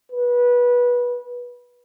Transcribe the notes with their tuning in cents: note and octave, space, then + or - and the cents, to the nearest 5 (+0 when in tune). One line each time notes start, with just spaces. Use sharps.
B4 -20